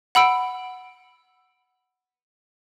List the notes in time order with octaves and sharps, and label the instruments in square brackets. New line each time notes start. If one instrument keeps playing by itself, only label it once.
[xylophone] F#5 B5 E6 D7